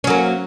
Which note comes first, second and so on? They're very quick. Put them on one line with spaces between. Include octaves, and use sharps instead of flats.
C#4 F#3 A#3